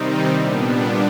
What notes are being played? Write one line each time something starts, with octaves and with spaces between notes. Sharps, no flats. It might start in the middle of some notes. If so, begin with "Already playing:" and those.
Already playing: C3 D#3 G3 C4 D#4
A#2 G3 B3 D4